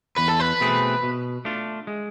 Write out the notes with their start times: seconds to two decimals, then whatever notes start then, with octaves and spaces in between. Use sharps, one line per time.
0.18 E2 B4
0.29 A4
0.40 B4
0.60 B2 A3 C4 G#4
1.03 B2
1.45 A3 D4 F4
1.87 G#3